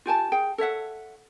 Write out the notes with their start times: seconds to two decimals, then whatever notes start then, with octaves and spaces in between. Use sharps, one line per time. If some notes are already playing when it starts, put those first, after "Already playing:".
0.06 F4 G4 G#5 A5
0.32 G#4 G5
0.58 A4 C#5 E5 F#5